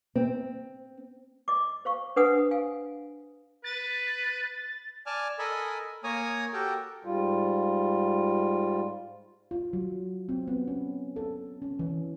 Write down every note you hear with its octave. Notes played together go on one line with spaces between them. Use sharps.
C4
D#5 D6
C5 F5 C#6
D4 B4 C5 F#5 G#5 D#6
F5 G#5
B4 A6
D5 G#5 A5 F6
A4 A#4 D#5 G#5 B5
A#3 C#5 G#5 A#5 D#6
F#4 G4 A4 A#4 G5
G#2 G3 F4
F4
F#3
C4
B3
C#4
A4
C#4
E3